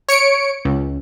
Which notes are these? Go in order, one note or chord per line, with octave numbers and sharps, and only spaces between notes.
C#5 C#7 D7
C#2